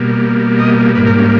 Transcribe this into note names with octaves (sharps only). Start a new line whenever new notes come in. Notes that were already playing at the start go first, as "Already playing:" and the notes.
Already playing: B2 G3 A#3
D#5
G#2 G3 A#3 B4
A#4
C#4